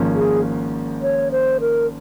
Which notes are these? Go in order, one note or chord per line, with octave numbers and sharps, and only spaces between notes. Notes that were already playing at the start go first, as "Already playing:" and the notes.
Already playing: G#1 G#2 F3 A#3 C#4
G#4
C#5
C5
A#4